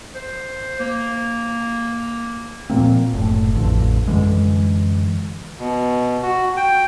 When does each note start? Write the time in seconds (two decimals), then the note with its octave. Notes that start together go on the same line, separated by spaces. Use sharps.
0.15 C5
0.79 A#3
2.70 A#2 F3 A#3 C4
3.14 F#1 A2
3.54 A1 F2 D3
4.08 F#2 D3 E3 G#3
5.59 B2
6.23 F#4
6.57 G5